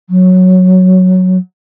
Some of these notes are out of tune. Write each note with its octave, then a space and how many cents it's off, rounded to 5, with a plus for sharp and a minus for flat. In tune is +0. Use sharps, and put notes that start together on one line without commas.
F#3 -5